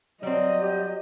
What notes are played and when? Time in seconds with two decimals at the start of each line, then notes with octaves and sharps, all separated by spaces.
0.23 F#3 G3 C4 D#5
0.61 G4